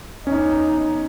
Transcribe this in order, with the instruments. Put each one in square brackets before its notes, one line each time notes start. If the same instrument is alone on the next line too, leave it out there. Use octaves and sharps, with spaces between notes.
[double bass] E2 D#4 [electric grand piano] C#4